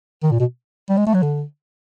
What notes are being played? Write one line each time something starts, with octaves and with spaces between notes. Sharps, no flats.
D#3
A#2
B2
G3
G#3
A3
F#3
D3